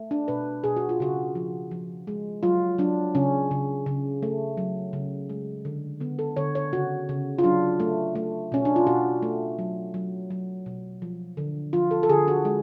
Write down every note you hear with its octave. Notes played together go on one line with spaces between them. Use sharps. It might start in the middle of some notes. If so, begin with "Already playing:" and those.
Already playing: A3
D4
B2 B4
B2 G#4
F#4
F4
C#3 F#4
F3
F3
G#3
F#3 F4
F#3 D4
C#3 C#4
C#3
C#3
A3
F#3
C#3
G#3
D3
D3 B3
A4
D3 C#5
C#5
C#3 F#4
C#3
F4
F#3 D4
A3
A3
B2 C#4
D4
F4
B2 F#4
A3
F#3
F#3
F#3
B2
F3
D3
F3 F4
A4
A4
D3 G#4
F#4
G#3